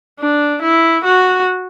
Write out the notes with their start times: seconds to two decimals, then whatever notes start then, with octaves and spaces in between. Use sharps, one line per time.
0.20 D4
0.62 E4
1.05 F#4